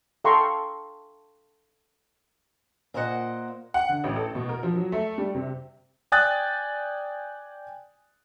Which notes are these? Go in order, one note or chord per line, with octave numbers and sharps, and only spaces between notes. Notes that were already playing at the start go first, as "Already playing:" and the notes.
A4 F5 G5 A#5 C6 C#6
A#2 A#3 C5 D#5 F#5
F#5
D3
A1
A4
B2
A#4
F3
F#3
A3
G3
C3
D5 G5 G#5 D#6 F#6 A6